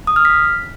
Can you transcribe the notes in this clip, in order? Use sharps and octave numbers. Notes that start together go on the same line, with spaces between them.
D#6
F6
B6